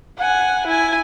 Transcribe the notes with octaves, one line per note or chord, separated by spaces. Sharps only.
F#5 G#5
E4 G#5